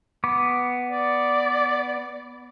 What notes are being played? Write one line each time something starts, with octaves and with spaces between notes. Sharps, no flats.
B3 D6
D5